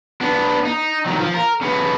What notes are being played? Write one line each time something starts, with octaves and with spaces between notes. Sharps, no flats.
B3 D4
D#4
D#3 F#3
F3
A#4
C#3 B3